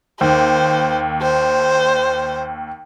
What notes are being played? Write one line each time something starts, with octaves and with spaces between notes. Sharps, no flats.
D#2 C5
C5